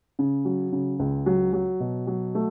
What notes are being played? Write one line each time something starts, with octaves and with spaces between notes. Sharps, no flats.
C#3
F#3
C#3
C#2
F#3
F#3
B2
F#3
A3